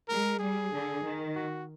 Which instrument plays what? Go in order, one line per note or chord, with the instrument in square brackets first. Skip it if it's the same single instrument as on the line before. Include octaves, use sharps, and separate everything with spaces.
[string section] G#3 [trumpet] A#4
[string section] G3 [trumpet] G#4
[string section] D3
D#3
[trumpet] F#4